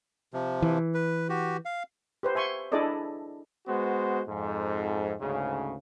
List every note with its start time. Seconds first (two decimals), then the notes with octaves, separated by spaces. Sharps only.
0.34 C3 F3
0.62 E3
0.94 B4
1.29 F#4 G4
1.65 F5
2.23 G4 B4 C5
2.35 E5 G#5 C6 C#6
2.72 D4 E4 G#4 A4 D5 D#5
3.68 G#3 B3 F#4 C5
4.28 F2 G#2
5.21 D2 G#2 C#3